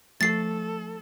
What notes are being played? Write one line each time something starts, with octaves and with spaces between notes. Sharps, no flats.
F3 A3 A4 A6 C7